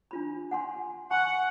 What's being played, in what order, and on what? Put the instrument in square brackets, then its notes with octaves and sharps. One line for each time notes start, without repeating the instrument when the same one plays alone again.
[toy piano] D4 F4 B5
F#5 G#5 C6
[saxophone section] F#5 [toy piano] G#5 B5 C#6